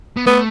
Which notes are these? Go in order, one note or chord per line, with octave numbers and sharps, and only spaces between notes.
B3
A3 B3